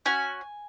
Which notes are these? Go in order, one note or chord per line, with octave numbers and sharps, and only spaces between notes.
C#4 F#4 G#5